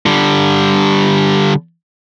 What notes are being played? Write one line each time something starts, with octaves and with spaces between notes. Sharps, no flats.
D3 G3